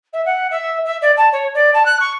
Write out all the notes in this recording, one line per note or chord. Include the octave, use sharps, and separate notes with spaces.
E5
F#5
E5
E5
D5
A5
C#5
D5
A5
F#6
C#6